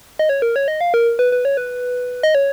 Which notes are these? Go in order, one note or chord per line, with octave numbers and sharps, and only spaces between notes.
D#5
C#5
A#4
C#5
D#5
F5
A#4
B4
B4
C#5
B4
D#5
C#5